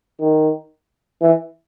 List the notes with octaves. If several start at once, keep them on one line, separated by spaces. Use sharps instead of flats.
D#3
E3